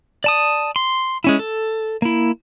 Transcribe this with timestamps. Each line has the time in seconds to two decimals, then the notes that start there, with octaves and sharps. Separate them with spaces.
0.24 D5 A5 D#6
0.76 C6
1.24 G#3 C#4 E4
1.39 A4
2.02 A#3 E4